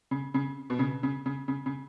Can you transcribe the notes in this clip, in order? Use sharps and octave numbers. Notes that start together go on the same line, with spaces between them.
C#3
C#3
B2
C#3
C#3
C#3
C#3
C#3